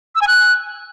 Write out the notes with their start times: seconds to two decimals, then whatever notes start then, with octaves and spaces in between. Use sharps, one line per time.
0.15 E6
0.21 G#5
0.27 F#6